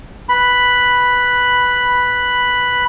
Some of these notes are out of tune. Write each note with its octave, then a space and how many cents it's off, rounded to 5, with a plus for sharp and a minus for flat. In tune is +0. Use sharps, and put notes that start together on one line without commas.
B4 +0 B5 +0